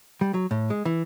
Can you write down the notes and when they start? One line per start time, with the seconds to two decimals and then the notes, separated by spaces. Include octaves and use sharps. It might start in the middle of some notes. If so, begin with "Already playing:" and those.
0.21 G3
0.34 F#3
0.51 A2
0.70 G#3
0.85 E3